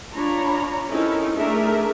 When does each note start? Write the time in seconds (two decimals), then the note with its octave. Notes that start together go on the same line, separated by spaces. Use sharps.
0.14 D4 F4 C#5 A#5 B5
0.88 C4 C#4 D#4 E4 A4 A#4
1.36 A3 D4 G#4 A#4 E5